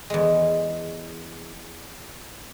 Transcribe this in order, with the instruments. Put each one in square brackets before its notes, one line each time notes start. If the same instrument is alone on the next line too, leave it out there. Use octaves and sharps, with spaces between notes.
[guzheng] E2 G#3